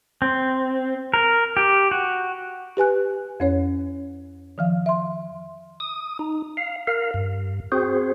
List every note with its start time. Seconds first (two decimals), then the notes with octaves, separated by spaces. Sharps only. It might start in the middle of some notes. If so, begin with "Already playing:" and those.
0.22 C4
1.14 A#4
1.57 G4
1.91 F#4
2.77 G4 B4 G#5 F#6
3.40 F2 C#4 C#5
4.58 D#3 F3 F5
4.86 E5 C6
5.80 D#6
6.19 D#4
6.57 F5
6.87 A#4 F5
7.14 G2
7.72 C4 F#4 G#4 C5